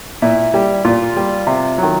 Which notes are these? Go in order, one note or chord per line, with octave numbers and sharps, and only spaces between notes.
A#2 E4
G3
A#2 F4
G3
C3
D#3 F#3